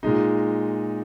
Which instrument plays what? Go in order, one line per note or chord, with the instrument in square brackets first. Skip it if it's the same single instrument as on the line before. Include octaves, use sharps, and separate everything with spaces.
[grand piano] A#2 G#3 D#4